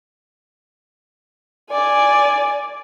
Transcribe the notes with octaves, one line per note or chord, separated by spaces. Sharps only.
D5 G#5